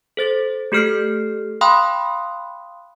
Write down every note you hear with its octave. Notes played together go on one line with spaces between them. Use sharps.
A4 C5 A6
A3 G4 A4 F6 G6 C7
F5 G5 B5 C6 D#6 F#6